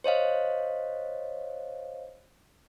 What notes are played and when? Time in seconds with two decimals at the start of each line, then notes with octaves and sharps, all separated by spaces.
0.04 C5 C#5 D#5 F5